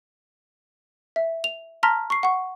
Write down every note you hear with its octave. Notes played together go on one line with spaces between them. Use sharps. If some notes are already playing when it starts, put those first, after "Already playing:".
E5
F7
A5 A#5 C6 F6 A#6 B6
C#6 C7
F#5 C#6